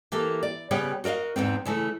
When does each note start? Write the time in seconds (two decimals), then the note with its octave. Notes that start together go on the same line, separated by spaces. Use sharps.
0.12 E3 A#3 G4 A4
0.43 D5
0.71 C#3 G3 B3 B4 C#5 G5
1.04 F#4 A#4 D5 D#5 F5
1.36 E2 G#2 B3 C4
1.65 C#3 E3 A3